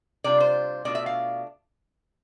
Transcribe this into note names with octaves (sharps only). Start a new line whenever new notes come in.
C3 G3 D4 F4 D5
C5
B2 A3 D4 F4 D5
E5
F5